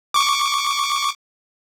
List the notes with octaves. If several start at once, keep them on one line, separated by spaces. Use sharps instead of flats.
C#6 D6